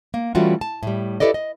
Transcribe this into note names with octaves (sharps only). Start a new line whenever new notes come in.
A#3
E3 G3 A3 C#4 F4 F#4
A5
A2 G3
E4 G4 A4 B4 D5 D#5
D#5